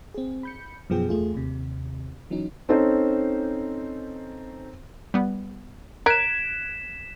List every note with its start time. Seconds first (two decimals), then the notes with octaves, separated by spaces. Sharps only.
0.14 C4 G#4
0.43 B5 G6 C#7
0.90 F#2 B2 F3 B3 G#4 G5
1.09 E2 A3 F4 G#4
1.34 D#2 C3
2.30 E3 F#3 C#4 D#4
2.69 C4 C#4 D#4 A4 C5
5.14 G3 B3
6.06 A#4 F#6 G#6 B6 D7 E7